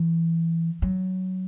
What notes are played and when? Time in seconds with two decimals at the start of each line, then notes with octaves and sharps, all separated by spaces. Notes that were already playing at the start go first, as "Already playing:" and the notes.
Already playing: E3
0.82 F#3